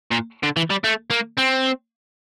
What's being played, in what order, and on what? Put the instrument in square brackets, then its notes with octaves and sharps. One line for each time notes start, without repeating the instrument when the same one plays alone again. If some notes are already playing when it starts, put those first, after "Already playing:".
[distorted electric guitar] A#2
D3
E3
G3
A3
A#3
C4